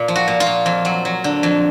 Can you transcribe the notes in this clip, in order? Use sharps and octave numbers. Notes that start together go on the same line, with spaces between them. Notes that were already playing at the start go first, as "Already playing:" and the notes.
Already playing: A#2
F3
F#4
A#2
F4
A#2
F2
F#3
F#3
D3
F2